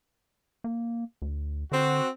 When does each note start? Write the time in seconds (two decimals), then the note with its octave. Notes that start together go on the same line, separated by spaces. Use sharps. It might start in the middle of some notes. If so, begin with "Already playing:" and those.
0.64 A#3
1.22 D2
1.72 D3 C4 F#4